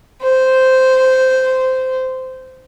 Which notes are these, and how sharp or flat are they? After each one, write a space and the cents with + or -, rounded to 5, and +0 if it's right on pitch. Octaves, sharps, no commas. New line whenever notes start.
C5 -10